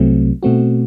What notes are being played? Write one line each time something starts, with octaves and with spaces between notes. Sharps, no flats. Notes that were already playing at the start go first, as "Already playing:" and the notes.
Already playing: C2 C3 F#3 A3 C4
B2 A3 C4 F#4